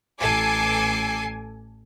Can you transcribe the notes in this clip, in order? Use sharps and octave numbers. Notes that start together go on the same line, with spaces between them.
A1 A4 G#5 D6 C7